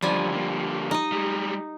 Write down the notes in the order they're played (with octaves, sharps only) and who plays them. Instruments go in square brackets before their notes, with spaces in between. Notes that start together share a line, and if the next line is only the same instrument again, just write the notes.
[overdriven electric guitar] F#2 D3 [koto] F3 G3 G#5
[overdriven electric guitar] D3 A#3
[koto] D#4 D#5
[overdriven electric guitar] G3 G#3